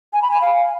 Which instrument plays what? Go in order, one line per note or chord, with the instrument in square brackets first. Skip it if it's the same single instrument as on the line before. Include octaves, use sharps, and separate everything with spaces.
[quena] G#5
B5
G#5
F5